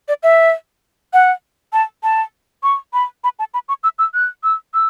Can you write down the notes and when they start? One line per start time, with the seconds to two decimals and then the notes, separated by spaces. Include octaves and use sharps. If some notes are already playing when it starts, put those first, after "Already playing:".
0.08 D5
0.23 E5
1.13 F#5
1.73 A5
2.03 A5
2.63 C#6
2.93 B5
3.24 B5
3.39 A5
3.54 B5
3.69 C#6
3.83 E6
3.99 E6
4.14 F#6
4.44 E6
4.74 E6